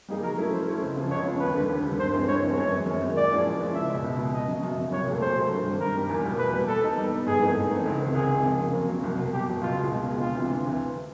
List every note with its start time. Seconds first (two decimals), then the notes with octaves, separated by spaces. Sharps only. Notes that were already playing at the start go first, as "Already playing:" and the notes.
0.08 G3 A#3 D#4 G#4
0.22 F#3 A#4
0.37 A3 C#4 E4
0.51 F#3 C5
0.67 A3 C#4 E4
0.81 C#2
0.96 C#3 F3
1.11 C#2 C#5
1.25 C#3 F3
1.40 D#2 B4
1.55 D3 G3
1.69 D#2
1.84 D3 G3
1.99 G2 C5
2.13 E3 G#3 C4
2.27 G2 C#5
2.42 E3 G#3 C4
2.57 F#2 C#5
2.72 D#3 G#3
2.86 F#2
3.01 D#3 G#3
3.16 A#2 D5
3.31 F3 G#3 C#4 E4
3.46 A#2
3.60 F3 G#3 C#4 E4
3.74 C#2 E5
3.90 B2 G#3
4.04 C#2
4.19 B2 G#3
4.33 F#2 D#5
4.48 C#3 F#3
4.63 F#2
4.77 C#3 F#3
4.92 C2 C#5
5.06 A#2 F#3 A3
5.21 C2 C5
5.36 A#2 F#3 A3
5.51 G2
5.66 D#3 G3
5.80 G2 A#4
5.95 D#3 G3
6.09 E2
6.24 B2 G3 A#3
6.38 E2 B4
6.54 B2 G3 A#3
6.68 G3 A4
6.83 B3 D#4
6.98 G3
7.13 B3 D#4
7.26 G#2 G#4
7.41 E3 A3 C4 D#4
7.56 G#2
7.71 E3 A3 C4 D#4
7.86 C#2
8.00 C3 D#3
8.14 C#2 G#4
8.30 C3 D#3
8.44 F2
8.59 C#3 F#3 A#3
8.74 F2
8.88 C#3 F#3 A#3
9.04 C2
9.17 B2 F#3
9.32 C2 G4
9.47 B2 F#3
9.61 C#2 F4
9.76 B2 G#3
9.92 C#2
10.06 B2 G#3
10.20 D2 F4
10.35 C3 E3
10.50 D2
10.65 C3 E3